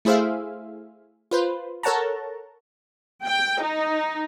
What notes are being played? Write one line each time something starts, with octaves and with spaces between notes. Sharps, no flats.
A3 E4 G#4 C5 E5 F5
F4 B4 C5
A4 A#4 C#5 F#5 A5 A#5
G5
D#4